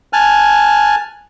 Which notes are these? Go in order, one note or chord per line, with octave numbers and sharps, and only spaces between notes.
G#5 A5 F6 F#6